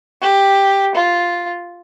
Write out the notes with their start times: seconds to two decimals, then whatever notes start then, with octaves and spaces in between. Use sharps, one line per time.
0.21 G4
0.95 F4